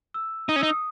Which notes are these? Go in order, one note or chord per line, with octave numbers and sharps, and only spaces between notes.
E6
D#4 D#6
C#4
D#4 E6
D#6